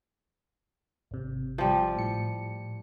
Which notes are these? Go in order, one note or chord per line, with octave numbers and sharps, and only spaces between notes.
G#1 C3
F3 G3
A2 C#7